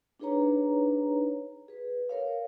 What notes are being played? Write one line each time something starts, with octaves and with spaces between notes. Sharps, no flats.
D4 D#4 G#4 B4 C#5 A#5
G#4 B4
A#4 C#5 F5